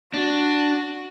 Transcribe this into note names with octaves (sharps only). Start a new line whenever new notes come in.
D4 F#4